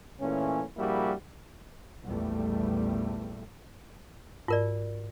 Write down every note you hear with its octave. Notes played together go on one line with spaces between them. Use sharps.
A#2 E3 A3 C#4
A#1 G3 A#3 E4 F#4 G#4
A#1 E2 G3 A3
G#2 F4 A#4 D5